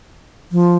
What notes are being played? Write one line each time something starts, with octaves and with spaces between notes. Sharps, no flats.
F3